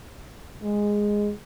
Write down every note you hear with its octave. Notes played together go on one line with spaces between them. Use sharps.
G#3